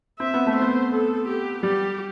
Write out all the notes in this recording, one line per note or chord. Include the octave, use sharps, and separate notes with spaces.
C4 E5
B3
A3
B3 C5
A4
G4
G3 G4